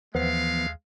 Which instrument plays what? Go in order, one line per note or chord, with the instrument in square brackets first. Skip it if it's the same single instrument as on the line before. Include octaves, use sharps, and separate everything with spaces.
[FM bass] D#2 [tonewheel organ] E3 F3 B3 [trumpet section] G#3 A3 F5